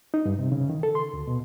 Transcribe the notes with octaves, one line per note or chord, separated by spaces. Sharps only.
D#4
G2
C3
C#3
D#3
A4
C6
D2
B2